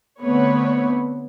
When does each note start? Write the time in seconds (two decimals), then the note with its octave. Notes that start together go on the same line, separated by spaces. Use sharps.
0.21 D3 A3 B3 C4 B4 C#5